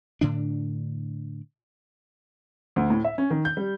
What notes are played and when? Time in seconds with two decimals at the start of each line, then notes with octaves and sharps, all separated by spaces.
0.21 A2 D3 D4
2.76 D2
2.90 A2
3.04 E5
3.18 C#4
3.30 D#3
3.45 G6
3.57 G3